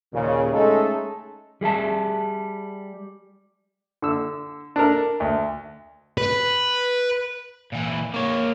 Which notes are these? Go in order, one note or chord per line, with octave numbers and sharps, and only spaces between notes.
D#2 A#2 C#3
G#3 A3 C#4 D#4 G#4 A4
G3 G#4 E5 A5
D3 E6
D4 A4 A#4
D2
B4
A#2 E3
A#3 C#5